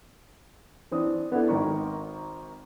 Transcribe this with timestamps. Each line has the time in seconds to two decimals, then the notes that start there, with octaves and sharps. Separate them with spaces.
0.91 E3 C4 D4 D#6
1.32 B3 D4 E4 A4
1.48 G#1 D#3 A#4 C#6